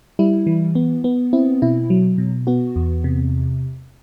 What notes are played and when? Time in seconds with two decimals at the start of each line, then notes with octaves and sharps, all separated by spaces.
0.19 G3 E4
0.47 E3
0.75 B3
1.04 B3
1.33 C4 E4
1.62 B2 E4
1.90 F#3
2.18 B2
2.47 B3 F#4
2.76 E2
3.04 C3